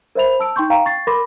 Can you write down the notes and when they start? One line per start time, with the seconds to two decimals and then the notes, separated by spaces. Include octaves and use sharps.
0.15 A#4 C5 E5 B5 F7
0.40 A5 E6 D7
0.56 D#4 G5 C6 C#6 G6
0.70 F5 G5 A#5
0.85 C#6 A6 C7
1.07 A#4 B5 C6 D6 A#6